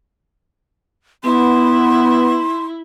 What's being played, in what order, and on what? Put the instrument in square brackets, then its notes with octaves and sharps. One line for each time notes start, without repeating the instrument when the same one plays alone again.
[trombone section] B3 [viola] E4 [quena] C6